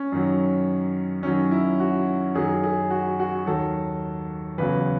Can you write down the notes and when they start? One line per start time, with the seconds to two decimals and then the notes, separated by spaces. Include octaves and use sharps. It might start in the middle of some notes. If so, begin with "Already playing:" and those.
Already playing: C#4
0.12 F#2 D#3 F#3
1.23 F#2 D#3 F#3 C#4
1.51 E4
1.80 F#4
2.35 F#2 D#3 F#3 G#4
2.64 G#4
2.90 F#4
3.19 F#4
3.46 D#2 D#3 F#3 A4
4.58 E2 C#3 F#3 B4